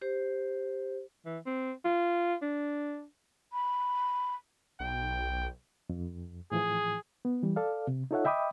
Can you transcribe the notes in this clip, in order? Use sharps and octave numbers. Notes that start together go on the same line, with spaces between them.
G4 C5
E3
C4
F4
D4
B5
B1 G5
F2
A2 E3 F3 G#4
B3
E3 G3
A4 D5 F5
C3
D#4 F4 A4 C#5 E5 F#5
D#5 E5 G5 B5 D6 D#6